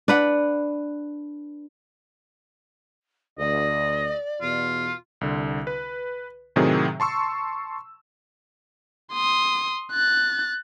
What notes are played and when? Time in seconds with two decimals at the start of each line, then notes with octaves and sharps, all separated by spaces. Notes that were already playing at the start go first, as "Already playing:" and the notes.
0.08 D4 B4 F#5
3.39 D2 D5 D#5
4.41 E2 B2 F4
5.21 C2 D3
5.67 B4
6.56 A2 C3 D#3 F#3 C4 G#4
7.00 A5 C6 C#6 E6
9.13 C6 D#6
9.92 F#6 A6